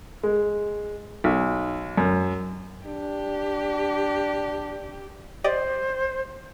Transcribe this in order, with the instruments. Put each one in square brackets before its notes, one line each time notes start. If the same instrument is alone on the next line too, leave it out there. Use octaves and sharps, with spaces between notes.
[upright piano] G#3
B1
F#2
[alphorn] D4 [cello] G4
[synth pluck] G4 D5 D#5 [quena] C5